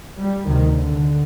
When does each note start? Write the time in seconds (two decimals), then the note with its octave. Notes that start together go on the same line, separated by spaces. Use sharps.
0.18 G3
0.47 D2 C3 D#3
0.75 D3